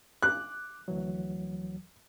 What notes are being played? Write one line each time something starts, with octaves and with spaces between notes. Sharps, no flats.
D6 F#6
D2 E3 F#3